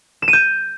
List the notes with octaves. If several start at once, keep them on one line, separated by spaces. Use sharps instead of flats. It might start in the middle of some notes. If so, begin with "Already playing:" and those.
E7
D#7
G6